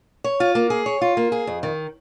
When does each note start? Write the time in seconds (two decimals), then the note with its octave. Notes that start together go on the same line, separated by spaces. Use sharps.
0.24 C#5
0.40 F4
0.55 A#3
0.70 G#4
0.86 C#5
1.01 F4
1.17 A#3
1.32 G#4
1.47 F2
1.63 D#3